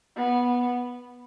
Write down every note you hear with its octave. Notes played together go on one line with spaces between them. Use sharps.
B3